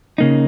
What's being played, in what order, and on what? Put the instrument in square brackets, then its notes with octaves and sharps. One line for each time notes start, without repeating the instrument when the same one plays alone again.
[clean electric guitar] C#3 A#3 D#4